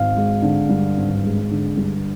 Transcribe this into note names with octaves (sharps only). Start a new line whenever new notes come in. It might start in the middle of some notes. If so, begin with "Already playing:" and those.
Already playing: G#1 F5
G#3
D3
G2
G#1
G#3
D3
G2